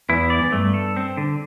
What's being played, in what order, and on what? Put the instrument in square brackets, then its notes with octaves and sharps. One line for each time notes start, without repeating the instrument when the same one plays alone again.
[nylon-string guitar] E2 [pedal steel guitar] E4
[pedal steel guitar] D5
[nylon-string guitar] E2
[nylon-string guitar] G2 [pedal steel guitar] A3
[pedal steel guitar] A4
C4
D3